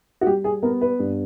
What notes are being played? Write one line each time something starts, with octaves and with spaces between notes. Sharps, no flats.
F#4
G3 G4
G#4
B3 A#4
B4
G2